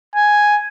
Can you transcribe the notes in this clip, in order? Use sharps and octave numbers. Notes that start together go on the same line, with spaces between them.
G#5